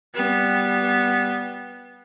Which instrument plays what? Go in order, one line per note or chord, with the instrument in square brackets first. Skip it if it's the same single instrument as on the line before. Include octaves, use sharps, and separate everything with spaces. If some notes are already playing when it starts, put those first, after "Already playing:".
[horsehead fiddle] G3 B3